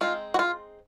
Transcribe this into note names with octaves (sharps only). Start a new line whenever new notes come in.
G#3 C4 D#4 F4
F#4
F4